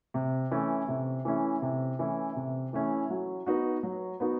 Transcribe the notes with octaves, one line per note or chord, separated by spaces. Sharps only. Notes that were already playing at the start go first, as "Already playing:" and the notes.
C3
E3 A3 C#4 E4
C3
E3 A3 C#4 E4
C3
E3 A3 C#4 E4
C3
E3 A3 C#4 E4
F#3
B3 D#4 F#4
F#3
B3 D#4 F#4